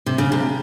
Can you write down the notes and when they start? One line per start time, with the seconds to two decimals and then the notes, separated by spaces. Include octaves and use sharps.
0.06 C3
0.18 C#3
0.32 C3